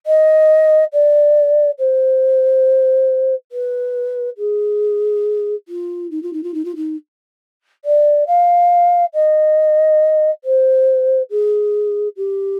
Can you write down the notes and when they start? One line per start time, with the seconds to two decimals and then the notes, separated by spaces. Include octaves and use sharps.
0.06 D#5
0.93 D5
1.78 C5
3.52 B4
4.38 G#4
5.68 F4
6.11 D#4
6.23 F4
6.33 D#4
6.43 F4
6.54 D#4
6.65 F4
6.76 D#4
7.85 D5
8.27 F5
9.14 D#5
10.44 C5
11.30 G#4
12.17 G4